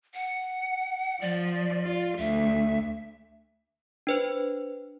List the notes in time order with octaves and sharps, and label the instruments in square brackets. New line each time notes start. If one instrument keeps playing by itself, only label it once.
[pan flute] F#5
[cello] F3 [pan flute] D5
[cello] F4
[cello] D2 [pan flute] E5
[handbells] D4 B4 C5